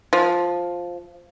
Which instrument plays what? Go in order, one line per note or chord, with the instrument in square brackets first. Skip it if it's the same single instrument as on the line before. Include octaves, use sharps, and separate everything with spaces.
[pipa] F3